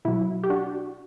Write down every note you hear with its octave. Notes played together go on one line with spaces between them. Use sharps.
B2 F#3 E4
G4
D4 F#4